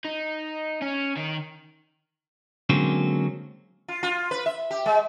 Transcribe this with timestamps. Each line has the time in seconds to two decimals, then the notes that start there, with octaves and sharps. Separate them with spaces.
0.05 D#4
0.82 C#4
1.17 D#3
2.70 D3 F#3 G#3 A#3 C4 C#4
3.88 F4
4.03 F4
4.31 B4
4.46 E5
4.71 G4
4.86 G#3